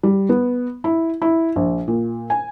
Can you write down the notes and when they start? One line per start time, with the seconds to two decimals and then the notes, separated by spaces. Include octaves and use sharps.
0.03 G3
0.29 B3
0.84 E4
1.22 E4
1.56 A#1
1.88 A#2
2.30 G#5